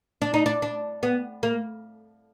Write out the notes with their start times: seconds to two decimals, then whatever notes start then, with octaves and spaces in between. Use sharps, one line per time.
0.22 D4
0.34 D#4
0.46 D4
0.62 D4
1.03 B3
1.43 A#3